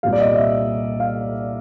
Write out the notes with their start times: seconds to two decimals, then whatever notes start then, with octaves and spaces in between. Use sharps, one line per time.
0.03 C2 A#2 G3 F5
0.13 D5
0.20 D#5
0.35 E5
1.00 F5